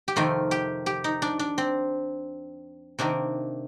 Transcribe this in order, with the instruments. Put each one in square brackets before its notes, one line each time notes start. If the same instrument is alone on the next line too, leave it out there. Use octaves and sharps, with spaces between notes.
[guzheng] G4
F2 C3 D#3 A3 F4
G4
G4
D#4
D4
D4
C4
C3 D#3 A#3 D4